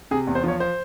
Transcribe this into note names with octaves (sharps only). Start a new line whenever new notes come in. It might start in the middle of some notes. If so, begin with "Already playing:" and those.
C3 G#4
E2
C5
F3 C#5
C5